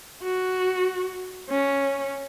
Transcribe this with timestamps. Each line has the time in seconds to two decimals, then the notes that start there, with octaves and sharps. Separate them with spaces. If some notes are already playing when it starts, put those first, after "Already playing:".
0.23 F#4
1.50 C#4